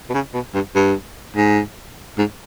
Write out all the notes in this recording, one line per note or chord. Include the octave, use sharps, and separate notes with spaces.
B2
C#3
B2
G2
G2
G#2
G#2